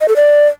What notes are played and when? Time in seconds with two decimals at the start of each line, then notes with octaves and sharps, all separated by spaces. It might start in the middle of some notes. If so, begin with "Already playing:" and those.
0.01 D#5
0.08 A4
0.16 D5